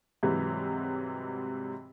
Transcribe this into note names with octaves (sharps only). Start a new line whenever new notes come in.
G#2 C3 E3 F#3 G3